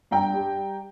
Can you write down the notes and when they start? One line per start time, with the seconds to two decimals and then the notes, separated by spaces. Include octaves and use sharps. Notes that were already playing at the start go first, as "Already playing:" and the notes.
0.11 G2 G5 A#5
0.33 G3